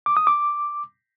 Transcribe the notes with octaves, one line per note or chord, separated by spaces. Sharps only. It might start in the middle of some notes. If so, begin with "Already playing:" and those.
D6
D#6
D6